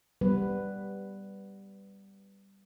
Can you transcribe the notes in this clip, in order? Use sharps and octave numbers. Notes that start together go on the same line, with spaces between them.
G3 B3 B4